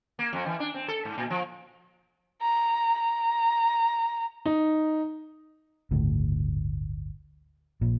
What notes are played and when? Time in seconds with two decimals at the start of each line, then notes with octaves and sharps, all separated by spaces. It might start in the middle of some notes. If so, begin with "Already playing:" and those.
0.19 A#3
0.33 F2
0.46 E3
0.60 D4
0.75 C4
0.88 A4
1.05 G#2
1.18 A#2
1.30 F3
2.42 A#5
2.99 A#5
4.46 D#4
5.91 G1 D2 A2 C#3
7.81 A#1 A#2